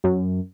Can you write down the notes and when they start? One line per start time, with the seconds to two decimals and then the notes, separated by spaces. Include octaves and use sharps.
0.04 F#2